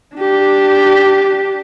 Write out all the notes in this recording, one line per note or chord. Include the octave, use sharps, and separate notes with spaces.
D4 G4